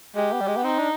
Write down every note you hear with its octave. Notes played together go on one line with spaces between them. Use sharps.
G#3 G4
B3
G3
G#3
B3
C4 D#4
D4